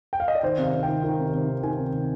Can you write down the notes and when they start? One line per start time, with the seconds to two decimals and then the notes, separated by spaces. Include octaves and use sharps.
0.13 G5
0.20 F5
0.28 D#5
0.35 D5
0.43 D#3 C5
0.58 C3
0.64 F5
0.74 C3
0.83 G5
0.88 D#3
1.04 D#3
1.19 C3
1.33 C3
1.48 D#3
1.63 D#3 G#5
1.79 C3
1.93 C3